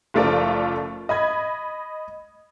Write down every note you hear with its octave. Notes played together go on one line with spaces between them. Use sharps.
F#1 F3 A3 F4 A#4 D5
D#5 B5 G#6